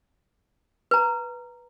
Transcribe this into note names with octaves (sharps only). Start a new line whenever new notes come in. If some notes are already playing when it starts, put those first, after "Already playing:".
B4 A#5